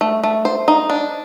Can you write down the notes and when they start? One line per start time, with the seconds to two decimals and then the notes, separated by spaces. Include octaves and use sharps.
0.01 A3
0.23 A3
0.45 C5
0.68 D#4
0.90 D4